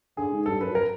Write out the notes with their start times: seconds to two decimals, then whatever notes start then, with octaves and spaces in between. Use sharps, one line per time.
0.17 D3 G#4
0.32 G#2
0.46 G2 A4
0.61 F#2 B4
0.71 F#2
0.75 A#4